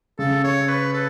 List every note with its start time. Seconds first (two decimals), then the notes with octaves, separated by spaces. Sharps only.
0.19 C#3 A4
0.44 C#5
0.69 B4
0.93 A4